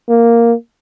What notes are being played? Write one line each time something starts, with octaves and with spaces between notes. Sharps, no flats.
A#3